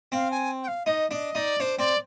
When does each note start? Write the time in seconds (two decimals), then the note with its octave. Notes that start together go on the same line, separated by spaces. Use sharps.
0.12 C4 F5
0.31 G#5
0.63 G5
0.68 F5
0.86 D#4 D#5
1.11 D4 D#5
1.35 D#4 D5
1.60 D4 C5
1.78 C4 D5